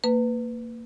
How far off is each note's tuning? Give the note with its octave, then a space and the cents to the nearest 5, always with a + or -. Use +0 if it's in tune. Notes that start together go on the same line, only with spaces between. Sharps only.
A#3 -20 B4 +10